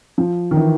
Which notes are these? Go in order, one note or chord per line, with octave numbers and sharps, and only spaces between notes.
F3
D#3
E3